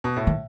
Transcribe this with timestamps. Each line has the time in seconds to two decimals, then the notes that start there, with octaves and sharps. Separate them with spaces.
0.04 B2
0.16 A2
0.27 D#3